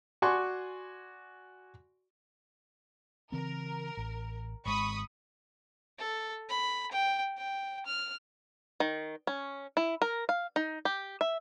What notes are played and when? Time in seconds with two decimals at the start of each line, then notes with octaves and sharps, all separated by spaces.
0.22 F#4 D5 G#5 C6 C#6
3.32 C#3 E3 C4 A#4
3.97 A1
4.65 G#1 G#3 B5 C#6 D#6
5.99 A4
6.49 B5
6.91 G5
7.37 G5
7.86 F6
8.80 D#3
9.27 C#4
9.77 E4
10.02 A#4
10.29 F5
10.56 D#4
10.85 G4
11.21 E5